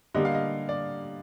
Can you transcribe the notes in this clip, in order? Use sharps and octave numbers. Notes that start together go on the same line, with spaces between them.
D3 G3 A#3 D#5
F5
D#5
D5